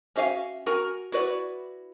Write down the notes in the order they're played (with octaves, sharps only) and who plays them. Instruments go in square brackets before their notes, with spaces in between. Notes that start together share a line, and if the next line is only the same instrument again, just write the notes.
[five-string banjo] C#4 F#4 E5 F5 G#5
F#4 A#4 G#5
E4 F#4 B4 D5